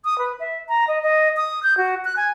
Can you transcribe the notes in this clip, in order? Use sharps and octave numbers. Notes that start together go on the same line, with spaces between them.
D#6
B4
E5
A#5
D#5
D#5
D#6
G6
F#4
F#6
G#5